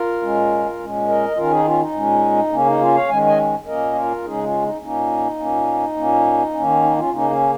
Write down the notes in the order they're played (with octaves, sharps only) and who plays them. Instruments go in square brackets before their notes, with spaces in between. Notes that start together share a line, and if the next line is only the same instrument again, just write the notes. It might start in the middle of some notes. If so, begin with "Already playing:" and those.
Already playing: [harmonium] F4 A#4
A#2 G#3 C#4
A#2 G#3 C#4
A#4 D#5
D#3 C#4 F4 A#4
D#4 G#4
C#4 F4
D#4
A#2 G#3 C#4
C#3 A#3 C#4
D#4
C#4 F4
C#5 F5
D#3 G#3 C#4 G#5
D#5 G#5
A#2 A#3 C#4 A#4 D#5
F4 A#4
C#3 G#3 C#4 D#4 G#4
C#4 F4
D#4
A#2 A#3 C#4 D#4
A#2 A#3 C#4
A#2 A#3 C#4
D#3 A#3 C#4
D#4
C#4 F4
C#3 A#3 C#4 D#4
C#4